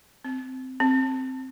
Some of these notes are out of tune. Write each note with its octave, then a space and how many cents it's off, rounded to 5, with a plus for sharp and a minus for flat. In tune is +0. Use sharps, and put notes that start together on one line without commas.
C4 -15
C4 +0